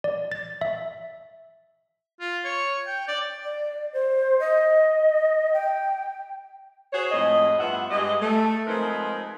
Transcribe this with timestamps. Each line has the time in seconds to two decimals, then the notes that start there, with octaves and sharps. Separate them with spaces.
0.04 D5
0.32 A6
0.61 E5
2.20 F4
2.44 C#5
2.87 G5
3.08 D5
3.43 D5
3.93 C5
4.40 D#5
5.53 G5
6.93 F#4 G#4 C5 C#5
7.12 F2 A2 G#3 D#5
7.59 G2 B3 F4 E5 F#5
7.91 G2 G#3 G4 D#5
8.21 A3
8.67 F3 G#3 C4 D#4 A#4 B4